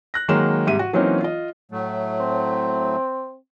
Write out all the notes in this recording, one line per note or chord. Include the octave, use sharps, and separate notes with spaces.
F#6 A#6
D#3 F#3 G#3 A#3 E7
G#2 C3 G3 E5 D#7
F#4
E3 F#3 A#3 C4 C#4 D#4
F4 D#5
A2 F#3 A3
C4